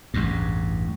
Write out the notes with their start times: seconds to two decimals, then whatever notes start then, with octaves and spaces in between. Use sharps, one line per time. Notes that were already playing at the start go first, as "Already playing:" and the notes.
0.14 A1 E2 G2